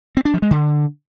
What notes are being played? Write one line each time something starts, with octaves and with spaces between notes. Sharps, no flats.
C4
D4
F3
G#3
D3